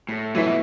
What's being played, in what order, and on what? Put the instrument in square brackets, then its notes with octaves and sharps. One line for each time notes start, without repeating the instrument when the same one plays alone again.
[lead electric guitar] A2
[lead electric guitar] E3 [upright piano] F#3 A3 E4 B4 E5
[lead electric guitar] B2